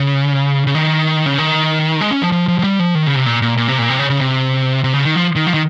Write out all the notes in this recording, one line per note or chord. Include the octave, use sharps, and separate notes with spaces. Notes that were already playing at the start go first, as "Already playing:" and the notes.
Already playing: C#3
C#3
D#3
C#3
D#3
G#3
C#4
F3
F3
F3
F3
G3
F3
D#3
C#3
C3
A#2
A#2
A#2
C3
A#2
C3
C#3
C#3
C3
C3
C#3
D#3
F3
D#3
F3
D#3